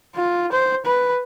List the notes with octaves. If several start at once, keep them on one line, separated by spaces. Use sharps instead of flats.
F4
C5
B4